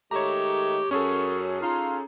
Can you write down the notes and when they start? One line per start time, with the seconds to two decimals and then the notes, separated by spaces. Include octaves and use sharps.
0.11 D#3 G#3 A3 G4 C#5 A#5
0.91 F#2 C#4 G#4 A4 C#5
1.62 D#4 F4